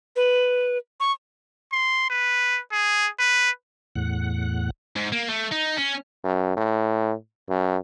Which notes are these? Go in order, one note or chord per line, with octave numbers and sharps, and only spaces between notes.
B4
C#6
C6
B4
G#4
B4
E2 A2 F#5
G#2
A#3
A3
D#4
C#4
F#2
A2
F#2